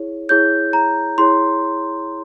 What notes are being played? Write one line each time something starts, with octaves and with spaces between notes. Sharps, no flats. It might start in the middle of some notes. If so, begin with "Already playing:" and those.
Already playing: E4 G#4 C#5
E4 G#4 C#5 G6
A#5
E4 G#4 C#5 C6